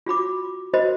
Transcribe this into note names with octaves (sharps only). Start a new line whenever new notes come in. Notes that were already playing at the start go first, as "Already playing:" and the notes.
F4 F#4 B5 D6
F#4 A#4 C5 D#5 B5